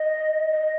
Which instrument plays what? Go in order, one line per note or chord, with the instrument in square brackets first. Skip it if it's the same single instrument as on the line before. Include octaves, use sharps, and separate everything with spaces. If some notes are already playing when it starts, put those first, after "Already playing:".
Already playing: [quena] D#5
D#5